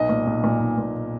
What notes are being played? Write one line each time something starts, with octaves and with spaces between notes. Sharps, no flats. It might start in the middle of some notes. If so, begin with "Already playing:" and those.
Already playing: B1 D#5
A#2
B1
A#2
B1
A#2